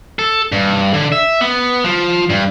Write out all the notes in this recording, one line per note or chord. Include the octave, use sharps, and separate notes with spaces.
A4
G2
D3
E5
B3
F3
G2